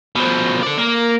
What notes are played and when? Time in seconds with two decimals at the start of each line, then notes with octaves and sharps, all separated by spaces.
0.16 B2 F3
0.63 A4 D5
0.78 A#3